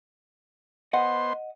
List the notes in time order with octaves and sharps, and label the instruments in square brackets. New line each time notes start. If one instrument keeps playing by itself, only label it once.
[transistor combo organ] B3 C5 C6 [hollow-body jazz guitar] D#5 F#5